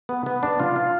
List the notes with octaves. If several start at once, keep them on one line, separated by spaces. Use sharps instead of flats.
B3
B3
D4
F4
F4